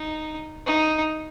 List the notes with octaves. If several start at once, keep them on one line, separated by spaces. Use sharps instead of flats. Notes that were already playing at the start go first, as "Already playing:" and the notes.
Already playing: D#4
D#4